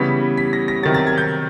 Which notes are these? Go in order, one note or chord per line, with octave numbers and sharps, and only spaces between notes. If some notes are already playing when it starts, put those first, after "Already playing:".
Already playing: C#3 E3 G3 B3 B6
B6
A#6
A#6
C3 D#3 F#3 A6
A6
G#6
G6